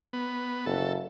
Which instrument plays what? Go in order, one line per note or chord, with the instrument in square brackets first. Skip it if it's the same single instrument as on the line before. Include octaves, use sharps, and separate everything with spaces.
[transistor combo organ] B3
[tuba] F#1 [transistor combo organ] A4